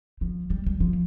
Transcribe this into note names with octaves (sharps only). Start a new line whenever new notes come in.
F3
G3
G3
F3